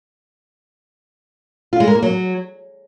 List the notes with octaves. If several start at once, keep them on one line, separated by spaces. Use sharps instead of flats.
F4
G#3
A#4
A#3
F#3